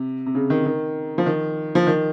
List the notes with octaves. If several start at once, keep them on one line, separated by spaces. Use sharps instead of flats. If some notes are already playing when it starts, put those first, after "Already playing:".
Already playing: C3
C3
C#3
D#3
D#3
F3
D#3
F3
D#3